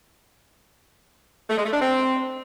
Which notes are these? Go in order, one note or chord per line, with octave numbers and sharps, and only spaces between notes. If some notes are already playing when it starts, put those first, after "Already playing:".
A3
G#3
A3
D4
C4